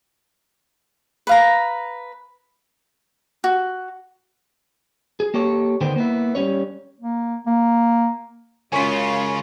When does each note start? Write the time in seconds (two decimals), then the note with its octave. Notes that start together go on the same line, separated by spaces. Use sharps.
1.27 B4 F5 A#5
3.44 F#4
5.20 G#4
5.34 A#3 G4 A4 C#5
5.81 D2 D3 D#3 B3 C5 G5
5.96 A#3 B3 E4
6.35 G3 C#4 C#5
7.01 A#3
7.46 A#3
8.72 F#2 C#3 G#3 C#4 F4 G#5 C#6 B6